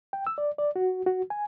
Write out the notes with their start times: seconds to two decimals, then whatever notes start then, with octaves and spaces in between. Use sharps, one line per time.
0.13 G5
0.27 E6
0.38 D5
0.58 D5
0.76 F#4
1.06 F#4
1.30 G#5